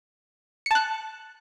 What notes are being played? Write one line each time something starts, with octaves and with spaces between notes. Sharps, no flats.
A5 F#6 C#7